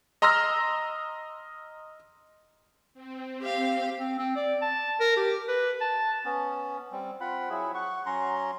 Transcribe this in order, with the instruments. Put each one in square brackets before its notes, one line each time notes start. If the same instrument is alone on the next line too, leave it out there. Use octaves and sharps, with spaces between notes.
[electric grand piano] D#5 A#5 C6 E6 F6 A#6
[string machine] C4
[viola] G4 F5
[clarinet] C4
C4
D5
A5
A#4
G4
B4
A5
[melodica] B3 C#4
G3 C4
C4 F4 F#5 B5
F#3 E4 G#4
F#5 C#6
F#3 C#4 A#5 C6